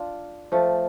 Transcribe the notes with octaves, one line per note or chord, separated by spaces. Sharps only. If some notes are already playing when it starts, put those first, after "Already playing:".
Already playing: D4 F4
F3 A3